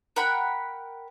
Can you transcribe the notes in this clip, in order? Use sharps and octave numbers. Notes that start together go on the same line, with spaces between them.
A#4 F#5 G5 B5